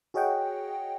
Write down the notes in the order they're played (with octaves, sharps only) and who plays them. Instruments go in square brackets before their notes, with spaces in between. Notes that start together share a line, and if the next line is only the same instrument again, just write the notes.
[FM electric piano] F#4 G#4 C#5 D#5 F#5 G5